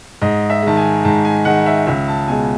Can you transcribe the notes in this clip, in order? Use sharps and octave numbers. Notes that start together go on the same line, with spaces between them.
G#2 D#5
E5
D#3 G#3 A5
G#5
G#2 A5
G#5
D#3 G#3 F#5
E5
C#2 E5
A5
B2 G#3 G#5